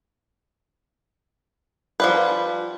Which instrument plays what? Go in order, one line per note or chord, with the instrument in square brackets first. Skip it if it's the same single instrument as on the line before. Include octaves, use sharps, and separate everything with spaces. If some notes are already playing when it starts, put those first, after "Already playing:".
[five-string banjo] F3 G3 B4